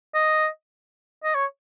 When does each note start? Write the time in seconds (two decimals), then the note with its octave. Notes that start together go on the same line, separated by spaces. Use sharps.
0.14 D#5
1.24 D#5
1.35 C#5